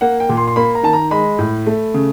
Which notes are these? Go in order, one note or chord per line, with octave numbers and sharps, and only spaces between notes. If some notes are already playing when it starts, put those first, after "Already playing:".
A#3 F#5
G5
A#2
C6
C6
A#3 B5
A#5
D#3 A5
A#5
G#3 B5
A2
A3
C#3